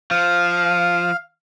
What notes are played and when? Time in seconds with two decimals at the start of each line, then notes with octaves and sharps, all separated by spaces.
0.11 F3 F5